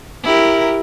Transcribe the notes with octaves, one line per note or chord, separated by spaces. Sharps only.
E4 G4 A#4